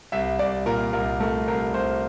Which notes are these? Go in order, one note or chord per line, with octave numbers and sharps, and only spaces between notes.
C2 E5
C2 D5
A#2 A#4
C2 A#4
A3 A#4
C2 A#4
C2 C5